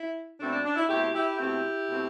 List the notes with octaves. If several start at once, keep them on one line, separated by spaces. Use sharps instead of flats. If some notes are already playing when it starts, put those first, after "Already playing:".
Already playing: E4
B2 A3 C4 D4
D4
D4
E4
B2 A3 C4 E4 G4
E4 G4
B2 A3 C4 E4 G4
B2 A3 C4